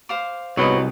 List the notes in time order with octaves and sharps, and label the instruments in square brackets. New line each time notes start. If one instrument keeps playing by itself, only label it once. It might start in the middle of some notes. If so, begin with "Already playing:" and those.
[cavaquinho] C5 F5 D6
[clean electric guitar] C2 [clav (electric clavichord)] G#2 B3 B4 [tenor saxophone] F#3 [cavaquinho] D#5 C6